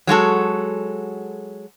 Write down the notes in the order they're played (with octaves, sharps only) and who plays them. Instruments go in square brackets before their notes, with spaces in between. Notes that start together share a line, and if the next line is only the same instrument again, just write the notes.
[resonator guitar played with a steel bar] F#3 G#3 F#4 A4